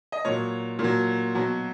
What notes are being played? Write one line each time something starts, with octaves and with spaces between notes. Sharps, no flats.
D#5
A#2 F#3 C#5
A#2
F#3
B2 F#3